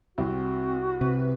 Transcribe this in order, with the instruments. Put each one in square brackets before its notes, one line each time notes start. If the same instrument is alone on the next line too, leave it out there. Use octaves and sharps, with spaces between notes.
[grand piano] C2 [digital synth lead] C4 [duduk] F#4
[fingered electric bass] C3 [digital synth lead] B4